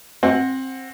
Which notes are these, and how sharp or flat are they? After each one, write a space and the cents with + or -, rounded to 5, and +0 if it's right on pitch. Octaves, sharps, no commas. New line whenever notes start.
C4 +15 F#5 -15